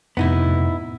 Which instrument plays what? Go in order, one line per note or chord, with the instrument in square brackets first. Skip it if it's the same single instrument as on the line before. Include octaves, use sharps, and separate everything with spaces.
[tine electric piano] F2 A2 C3 [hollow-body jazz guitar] B3 D#4 E4